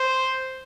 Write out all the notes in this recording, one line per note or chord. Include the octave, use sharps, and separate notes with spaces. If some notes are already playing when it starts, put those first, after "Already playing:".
Already playing: C5